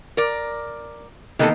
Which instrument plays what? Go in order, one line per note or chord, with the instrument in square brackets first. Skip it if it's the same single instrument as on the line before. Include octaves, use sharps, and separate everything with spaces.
[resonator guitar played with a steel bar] A#4 D5
[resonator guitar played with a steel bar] C3 E3 A4 [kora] D#3 A#3 B3